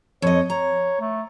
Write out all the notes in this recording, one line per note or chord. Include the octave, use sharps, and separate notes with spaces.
F2 C#5 D#5
C#5 A#5
A3